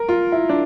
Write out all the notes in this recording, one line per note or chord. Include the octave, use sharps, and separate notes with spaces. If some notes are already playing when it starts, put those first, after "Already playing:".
Already playing: A#4
F4
E4
D4